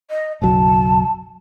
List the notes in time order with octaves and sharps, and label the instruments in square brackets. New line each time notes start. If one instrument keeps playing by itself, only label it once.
[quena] D#5
[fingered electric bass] F#1 B1 F#3 [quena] A5